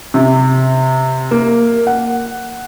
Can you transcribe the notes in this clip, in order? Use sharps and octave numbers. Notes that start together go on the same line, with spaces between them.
C3
A#3
F#5